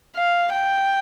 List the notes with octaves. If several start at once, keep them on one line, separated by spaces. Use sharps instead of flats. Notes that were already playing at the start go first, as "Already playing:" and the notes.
F5
G5